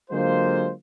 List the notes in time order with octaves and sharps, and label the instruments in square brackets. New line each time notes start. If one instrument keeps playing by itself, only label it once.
[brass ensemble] D3 F#3 G#3 A#3 F4 C5